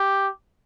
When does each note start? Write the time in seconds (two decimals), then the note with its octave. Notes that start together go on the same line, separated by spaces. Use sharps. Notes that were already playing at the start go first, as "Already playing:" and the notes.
Already playing: G4